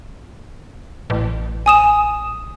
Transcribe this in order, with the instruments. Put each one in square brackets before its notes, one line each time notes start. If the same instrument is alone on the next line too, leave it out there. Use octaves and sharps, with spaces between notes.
[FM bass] A1
[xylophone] G#5 D#6 E7